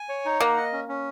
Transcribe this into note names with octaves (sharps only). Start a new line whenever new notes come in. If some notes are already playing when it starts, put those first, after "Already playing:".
Already playing: G#5
C#5
D#4
A#3 F#5
D#5
C#4
C#4